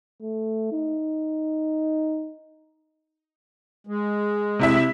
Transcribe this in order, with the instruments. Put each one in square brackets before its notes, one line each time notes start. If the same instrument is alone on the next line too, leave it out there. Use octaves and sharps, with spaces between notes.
[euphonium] A3
D#4
[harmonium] G#3
[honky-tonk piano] C3 E4 E5